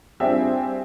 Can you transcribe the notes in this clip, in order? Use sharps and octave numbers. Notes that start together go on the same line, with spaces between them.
G3 C4 D4 F4 G#4 E5